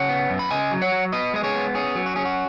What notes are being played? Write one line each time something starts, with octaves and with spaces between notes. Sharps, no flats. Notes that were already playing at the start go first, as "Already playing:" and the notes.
Already playing: C#3 C#5 F#5
B3
F#2
B5
C#3 D#5 G#5
F#3
C#5 F#5
F#3
B3 B4 D#5
G#3 D#5
G#4 C#5
B3
C#4 G#4
F#3
F#4
C#4 G#4
F#4